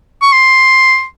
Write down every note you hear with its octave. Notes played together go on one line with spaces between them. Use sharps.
C#6
C6